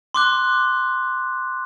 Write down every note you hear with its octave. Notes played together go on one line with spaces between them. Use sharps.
C6 D6 F#6